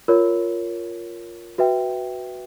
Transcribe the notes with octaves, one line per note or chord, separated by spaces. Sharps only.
F4 A#4 C#5
F#4 B4 E5 G5